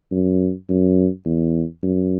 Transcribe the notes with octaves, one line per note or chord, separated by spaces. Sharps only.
F#2
F#2
E2
F#2